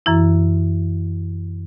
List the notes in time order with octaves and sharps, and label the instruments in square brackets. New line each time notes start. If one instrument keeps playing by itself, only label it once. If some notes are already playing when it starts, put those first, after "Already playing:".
[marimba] F#2 E3 E4